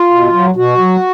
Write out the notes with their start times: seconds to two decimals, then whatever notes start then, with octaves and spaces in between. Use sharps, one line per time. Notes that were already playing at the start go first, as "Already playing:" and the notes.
Already playing: F4
0.10 B2
0.32 F#3
0.56 B2 F#4
0.78 F#3